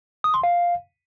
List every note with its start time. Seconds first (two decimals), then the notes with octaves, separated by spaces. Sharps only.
0.24 D#6
0.34 C6
0.43 F5